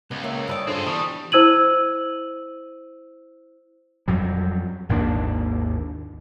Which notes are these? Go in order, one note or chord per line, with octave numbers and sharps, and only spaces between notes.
C#2 B3
A#3 C#5 E5
G2 B4 C#5 D5 D#6 E6
D3 F3 C4 G#4 C5
E3 G3 B3 A5 C#6 D#6
E4 C5 E6 G#6 D#7 F#7
F2 F#3 G3
G#1 D#2 A#3 D4